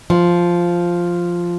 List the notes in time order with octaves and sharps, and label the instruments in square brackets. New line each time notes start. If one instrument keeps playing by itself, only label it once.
[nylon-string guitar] F3